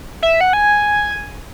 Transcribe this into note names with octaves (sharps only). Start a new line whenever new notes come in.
E5
F#5
G#5